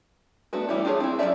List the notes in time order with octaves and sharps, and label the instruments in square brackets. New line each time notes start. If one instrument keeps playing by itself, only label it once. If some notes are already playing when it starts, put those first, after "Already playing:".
[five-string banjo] A3 B3 D4 F#4 B4
E3 G3 C#4 E4
D4 F4 G#4 A4 C#5
C4 E4
F#3 C4 C#4 D5 E5